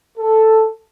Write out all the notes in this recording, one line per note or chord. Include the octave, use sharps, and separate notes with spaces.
A4